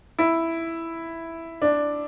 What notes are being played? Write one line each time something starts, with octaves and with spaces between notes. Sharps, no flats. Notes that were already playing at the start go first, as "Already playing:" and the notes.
E4
D4